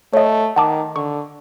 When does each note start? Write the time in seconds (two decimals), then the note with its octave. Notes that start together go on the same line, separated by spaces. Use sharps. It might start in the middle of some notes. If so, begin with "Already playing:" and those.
0.13 A3 C#5 D#5
0.56 D#3 F#5 A5 D6
0.96 D3 C#6